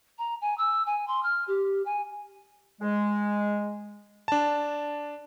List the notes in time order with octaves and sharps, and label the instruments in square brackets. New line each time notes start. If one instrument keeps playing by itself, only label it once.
[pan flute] A#5
G#5
E6
G#5
C6
F6
G4
G#5
[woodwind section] G#3
[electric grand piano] D4 A5